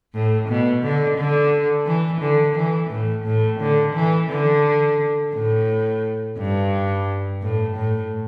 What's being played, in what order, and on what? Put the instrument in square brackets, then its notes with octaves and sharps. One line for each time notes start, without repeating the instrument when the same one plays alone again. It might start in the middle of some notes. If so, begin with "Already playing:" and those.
[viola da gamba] A2
B2
D3
D3
E3
D3
E3
A2
A2
D3
E3
D3
A2
G2
A2
A2